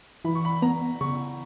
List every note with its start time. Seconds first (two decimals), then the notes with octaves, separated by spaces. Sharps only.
0.24 E3 B5
0.35 C#6
0.45 B5
0.62 B3 A#5
1.01 C#3 C#6